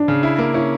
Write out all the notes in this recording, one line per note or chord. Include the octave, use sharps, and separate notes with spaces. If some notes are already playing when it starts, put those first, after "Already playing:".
Already playing: D4
C#3
E4
A#3
C#4 E4